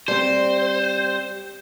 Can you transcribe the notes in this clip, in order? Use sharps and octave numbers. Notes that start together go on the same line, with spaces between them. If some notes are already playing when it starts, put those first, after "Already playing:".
G3 C4 C5